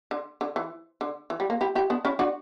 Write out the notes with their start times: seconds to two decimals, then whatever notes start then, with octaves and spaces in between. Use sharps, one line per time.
0.11 D3
0.41 D3
0.56 E3
1.01 D3
1.30 E3
1.40 G3
1.50 A#3
1.61 E4 G4
1.75 E4 G4
1.90 B3 D4
2.05 C#4 E4
2.19 D4 F#4